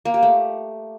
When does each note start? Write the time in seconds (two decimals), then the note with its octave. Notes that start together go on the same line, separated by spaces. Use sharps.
0.05 A#3
0.14 G4
0.23 A3